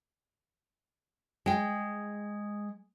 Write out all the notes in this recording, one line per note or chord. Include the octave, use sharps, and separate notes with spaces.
G#3 G5